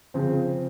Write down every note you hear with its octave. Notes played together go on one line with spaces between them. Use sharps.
C#3 F3 C4